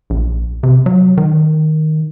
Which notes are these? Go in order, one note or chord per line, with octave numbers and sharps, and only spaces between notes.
A#1
C3
F#3
D#3